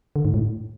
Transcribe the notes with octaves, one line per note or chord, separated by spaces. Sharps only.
D3
G#2
A2